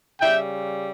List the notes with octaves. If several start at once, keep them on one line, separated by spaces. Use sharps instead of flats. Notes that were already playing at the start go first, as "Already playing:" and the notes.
C#3 G3 E5 G5